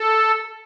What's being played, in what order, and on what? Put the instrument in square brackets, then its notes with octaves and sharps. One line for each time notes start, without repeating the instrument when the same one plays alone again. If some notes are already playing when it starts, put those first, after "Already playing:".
Already playing: [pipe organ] A4